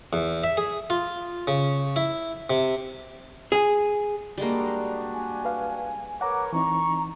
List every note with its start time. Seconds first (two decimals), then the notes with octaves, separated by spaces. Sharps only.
0.13 E2
0.44 E5
0.57 G#4
0.90 F4
1.47 C#3
1.96 E4
2.50 C3
3.52 G#4
4.38 G3 G#3 A#3 D4 F#4 G4
5.14 G#5
5.45 B4 F5
6.21 A#4 B4 C#5 F#5 A#5 D6
6.53 E3 C4 D#4 A#5 C#6